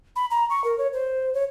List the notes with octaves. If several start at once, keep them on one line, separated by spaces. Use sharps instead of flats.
B5
A#5
C#6
A#4
C#5
C5
C#5